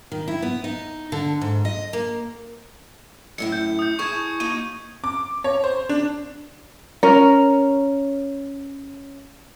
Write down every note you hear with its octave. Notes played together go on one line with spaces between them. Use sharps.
D#3
E4
B3
D#4
D3
G#2
D#5
A#3
F#2 A2 E4 C#7
G6
D#6 G6
E4 G#4 A5 C#6 G#6
A#3 D#4 F#4 D#7
D6
C#5
C5
D4
C#4 A#4